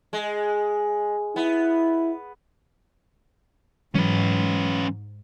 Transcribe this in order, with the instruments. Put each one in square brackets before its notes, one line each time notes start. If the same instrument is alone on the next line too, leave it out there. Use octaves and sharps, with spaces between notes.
[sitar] G#3
[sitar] B3 [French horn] E4
[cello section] G#2 [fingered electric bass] E3 F#3 G#3 [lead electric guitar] C#4 B4